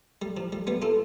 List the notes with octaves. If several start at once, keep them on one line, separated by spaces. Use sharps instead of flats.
G3
F3
G3
G3 B3
F4 A4